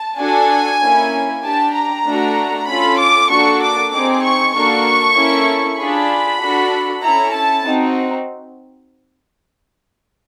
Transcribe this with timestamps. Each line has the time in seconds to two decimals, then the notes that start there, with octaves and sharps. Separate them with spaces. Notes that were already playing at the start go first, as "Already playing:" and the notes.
Already playing: A5
0.19 D4 F#4 A4 G#5
0.81 A#3 C#4 E4
1.43 D4 G4 A5
1.74 A#5
2.06 A3 D4 F#4
2.68 C#4 F4 A4 B5
2.98 D6
3.29 A#3 D4 F#4 A4 C#6
3.61 D6
3.92 C4 D#4 G#4 D6
4.23 C#6
4.54 A#3 D4 F#4 A4 C#6
5.16 A#3 C#4 E4 A4
5.78 D4 F4 G#4 B5
6.40 D4 F#4 A4
7.02 C#4 E4 A4 A#5
7.33 A5
7.64 C4 D#4 F#4